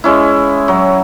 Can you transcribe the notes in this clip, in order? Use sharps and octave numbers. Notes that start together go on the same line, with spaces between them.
G#3 C#4 E4
F#3